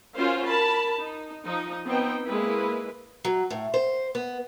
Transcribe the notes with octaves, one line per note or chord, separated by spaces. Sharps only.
C#4 F4 F#4 A#4 C5 F5
A#4 A5 B5
D#4
F3 D#4
B3 C4 D#4 G5
G#3 A#3 E4 B4
F#3
A2
C5
B3